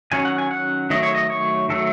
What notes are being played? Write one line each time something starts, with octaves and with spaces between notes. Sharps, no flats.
D#3 F#3 C#4 G#5
F#5
G#5
F#5
D#3 F#3 A3 D#5
C#5
D#5
C#5
D#3 F#3 A3 A4